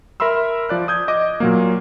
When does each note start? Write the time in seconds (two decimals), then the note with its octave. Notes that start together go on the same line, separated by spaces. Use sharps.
0.20 A#4 E5 B5 C6 E6
0.69 F3 D5 F#6
0.88 D#6 G6 G#6
1.08 D#5 D6
1.40 A#2 F#3 A#3